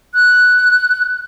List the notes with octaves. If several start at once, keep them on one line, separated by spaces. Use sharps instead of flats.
F#6